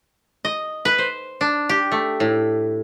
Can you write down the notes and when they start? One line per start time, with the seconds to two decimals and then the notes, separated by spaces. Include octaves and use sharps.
0.45 D#5
0.85 B4
0.98 C5
1.41 D4
1.69 G4
1.92 A3
2.20 A2